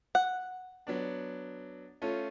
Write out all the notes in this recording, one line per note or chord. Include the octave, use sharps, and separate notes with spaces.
F#5
F#3 B3 D4
A3 C#4 F4